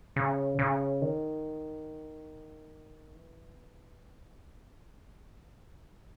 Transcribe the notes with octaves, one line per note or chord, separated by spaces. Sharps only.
C#3
C#3
D#3
E3
A#3
G#3
B3